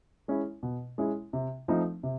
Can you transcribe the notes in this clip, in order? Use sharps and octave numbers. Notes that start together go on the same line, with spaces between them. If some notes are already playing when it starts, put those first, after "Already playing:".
G#3 C#4 E4
B2
G#3 C#4 E4
C3
F3 A3 C4 D#4
C3